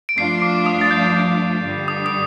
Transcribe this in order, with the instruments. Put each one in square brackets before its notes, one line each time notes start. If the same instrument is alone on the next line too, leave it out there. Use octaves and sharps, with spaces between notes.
[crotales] D7
[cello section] G2 F3 A3 D4 F4 [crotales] C7
[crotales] D6
D#6
A6
G6
[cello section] G2 D3 G3
[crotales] D#6
D#6